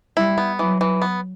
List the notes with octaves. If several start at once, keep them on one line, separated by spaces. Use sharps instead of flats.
G3 E4
B3
E3 F#3
E3
B3